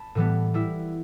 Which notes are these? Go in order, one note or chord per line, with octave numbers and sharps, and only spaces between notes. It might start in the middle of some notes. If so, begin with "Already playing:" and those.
Already playing: A5 B5
A2 E3 G3 B3
G3 E4